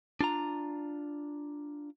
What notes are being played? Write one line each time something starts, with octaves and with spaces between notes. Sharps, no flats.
D4 F4 A#5